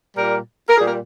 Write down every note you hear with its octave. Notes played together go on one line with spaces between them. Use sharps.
A#2 G3 A#4
A#4
A#2 G3 G#4
A#4